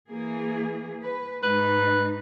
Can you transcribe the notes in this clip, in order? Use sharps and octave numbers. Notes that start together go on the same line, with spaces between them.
E3 A#3 G#4
B4
G#2 D#4 B4